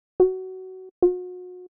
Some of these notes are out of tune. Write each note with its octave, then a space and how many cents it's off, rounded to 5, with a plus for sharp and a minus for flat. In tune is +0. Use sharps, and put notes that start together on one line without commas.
F#4 +20
F#4 -35